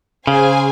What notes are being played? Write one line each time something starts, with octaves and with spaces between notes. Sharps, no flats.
C#3 G#4 C5 F5 G#5